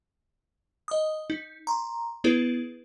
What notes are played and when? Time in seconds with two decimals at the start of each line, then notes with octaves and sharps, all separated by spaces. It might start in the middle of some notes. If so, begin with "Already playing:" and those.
0.88 D#5 D#6
1.30 D#4
1.67 A#5 C6
2.24 B3 E4 G#4 B4